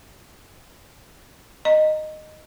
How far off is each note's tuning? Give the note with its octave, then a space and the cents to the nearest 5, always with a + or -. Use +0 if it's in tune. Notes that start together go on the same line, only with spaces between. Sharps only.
D#5 -10 A#5 +0